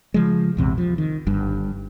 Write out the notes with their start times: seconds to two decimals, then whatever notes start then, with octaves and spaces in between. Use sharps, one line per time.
0.14 C#3 F3 G#3
0.57 A#1 E2 C3
0.78 F3
0.98 D#3
1.27 G1 G2